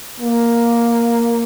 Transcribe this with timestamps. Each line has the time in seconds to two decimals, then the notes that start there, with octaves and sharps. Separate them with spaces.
0.20 A#3